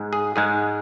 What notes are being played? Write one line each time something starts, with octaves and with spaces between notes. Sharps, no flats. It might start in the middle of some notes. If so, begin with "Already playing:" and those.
Already playing: G#2 G#3
G#4
G#2 G#3 G#4